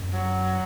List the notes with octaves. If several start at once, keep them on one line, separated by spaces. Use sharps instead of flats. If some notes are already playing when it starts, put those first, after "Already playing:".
Already playing: F#2
F#3